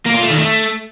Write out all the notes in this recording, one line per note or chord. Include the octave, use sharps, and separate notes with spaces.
A#3
F4
A3
D#3
A3